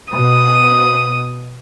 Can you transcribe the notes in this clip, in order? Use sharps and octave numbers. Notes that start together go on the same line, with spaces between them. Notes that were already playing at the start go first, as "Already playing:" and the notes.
B2 D#6